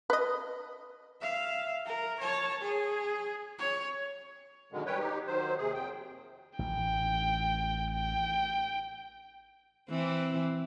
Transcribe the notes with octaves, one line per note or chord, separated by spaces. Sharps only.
B4 D#5
E5 F5
A#4
C#5 A5
G#4
C#5
F#2 B2 D3 D#3 G#3
E3 G3 B4 C#5 G5
D#4 G4
D#3 F#3 C5
D#2 C3 G#4
F2 G5
A1 G5
G5
E3 C4